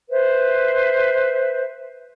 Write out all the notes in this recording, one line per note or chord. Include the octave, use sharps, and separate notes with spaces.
B4 C5 E5